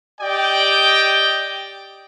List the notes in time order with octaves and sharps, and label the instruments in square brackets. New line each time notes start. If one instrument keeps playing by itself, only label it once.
[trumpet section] G4 D5 D#5 G5